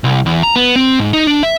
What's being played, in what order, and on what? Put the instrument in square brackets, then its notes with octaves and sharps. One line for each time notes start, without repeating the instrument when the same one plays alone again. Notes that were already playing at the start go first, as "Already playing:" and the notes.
[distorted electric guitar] C2
E2
A#5
B3
C4
G#2
D#4
D4
E5